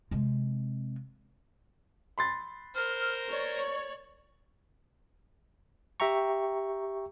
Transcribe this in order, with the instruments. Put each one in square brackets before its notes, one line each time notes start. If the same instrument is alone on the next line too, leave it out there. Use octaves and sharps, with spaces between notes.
[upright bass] C3 G#3
[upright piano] B5 C6 A6
[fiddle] A#4 C5 [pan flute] F6
[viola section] C#5 [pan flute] D5
[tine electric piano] G4 E5 G5 A#5 C#6